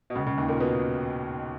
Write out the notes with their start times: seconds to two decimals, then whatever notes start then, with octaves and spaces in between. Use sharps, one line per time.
0.10 B2
0.15 C#2 C#3
0.26 C#2 C#3
0.38 D#2 D#3
0.48 A#2 A#3
0.60 B2 B3